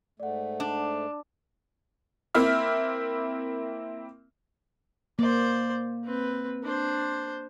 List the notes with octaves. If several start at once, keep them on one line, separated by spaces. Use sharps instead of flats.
G#2 A3 D5 F#5
D4
A#3 C4 E4 E5 F6
A#3 C5 D5
C4 B4
D4 C5